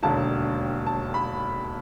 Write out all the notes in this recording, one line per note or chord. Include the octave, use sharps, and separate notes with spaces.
E1 D#2 D3 A5
A5
B5